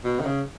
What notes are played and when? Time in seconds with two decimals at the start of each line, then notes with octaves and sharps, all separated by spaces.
0.04 B2
0.20 D#3
0.25 C#3